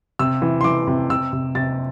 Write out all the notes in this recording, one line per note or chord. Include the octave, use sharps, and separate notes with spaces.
C3 E6
E3
C6
E3 D6
C3
C3 E6
C3
C3 A6